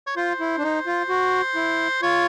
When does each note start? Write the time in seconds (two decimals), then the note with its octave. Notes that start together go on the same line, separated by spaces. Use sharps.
0.07 C#5
0.17 F4 C5
0.40 E4
0.58 D4
0.63 D#4
0.86 F4
1.09 F#4
1.55 E4
2.02 F4 C#5